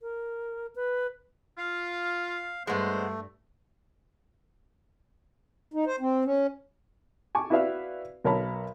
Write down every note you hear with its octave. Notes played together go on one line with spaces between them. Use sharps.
A#4
B4
F4 F5
G2 G#3 A3 B3 C5
D#4
C5
C4
C#4
G#5 A5 C#6 D6
E4 F#4 B4 D5 E5 F5
B1 A#4 C#5 A5 B5